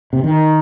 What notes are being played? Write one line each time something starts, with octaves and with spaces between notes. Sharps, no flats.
C3
D#3 D#4